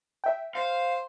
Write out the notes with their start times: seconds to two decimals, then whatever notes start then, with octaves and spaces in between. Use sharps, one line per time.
0.24 E5 G5
0.55 C5 F5